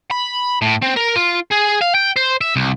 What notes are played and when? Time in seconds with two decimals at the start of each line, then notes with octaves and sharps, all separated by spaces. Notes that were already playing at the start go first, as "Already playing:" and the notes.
0.11 B5
0.62 A2
0.83 C4
0.97 A#4
1.16 F4
1.51 G#4
1.81 F5
1.94 G5
2.16 C5
2.41 E5
2.56 C2